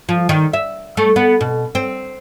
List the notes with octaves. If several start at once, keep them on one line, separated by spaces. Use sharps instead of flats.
F3
D#3
E5
A3
B3
B2
C4